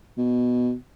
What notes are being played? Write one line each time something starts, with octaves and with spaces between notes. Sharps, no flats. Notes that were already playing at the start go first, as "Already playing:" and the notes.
B2